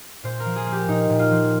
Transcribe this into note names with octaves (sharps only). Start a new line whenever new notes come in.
A#2 C5
A#4
F3
G#4
A#3
G4
A#2 D#4
A#2
F4
F3